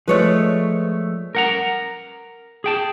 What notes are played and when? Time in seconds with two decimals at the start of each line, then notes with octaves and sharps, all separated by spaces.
0.08 F3 G#3 A3 B4 C#5 D5
1.35 A#4 F#5 A#5
2.64 G#4 G5 A5